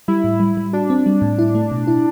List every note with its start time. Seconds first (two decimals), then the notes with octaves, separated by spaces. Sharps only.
0.08 G3 E4
0.24 A2
0.40 G3
0.57 G3
0.73 D4 F#4
0.90 C4
1.06 G3
1.22 A2
1.39 E4
1.55 A3
1.72 B2
1.87 E4